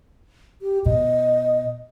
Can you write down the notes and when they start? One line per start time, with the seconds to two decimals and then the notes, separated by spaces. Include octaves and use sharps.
0.62 G4
0.86 B2 D#5